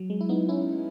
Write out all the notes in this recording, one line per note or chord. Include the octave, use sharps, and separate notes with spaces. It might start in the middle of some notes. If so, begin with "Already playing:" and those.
Already playing: F#3
G#3
E4
B3 D#4
C#4 E4